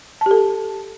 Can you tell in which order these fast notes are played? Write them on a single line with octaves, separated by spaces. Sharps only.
A5 G4 A4